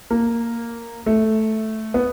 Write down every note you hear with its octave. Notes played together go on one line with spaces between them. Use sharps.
A#3
A3
B3